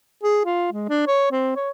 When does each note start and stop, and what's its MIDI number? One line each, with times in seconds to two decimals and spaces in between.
0.23 0.41 68
0.45 0.69 65
0.72 0.89 56
0.89 1.06 62
1.07 1.29 73
1.31 1.55 60
1.56 1.70 73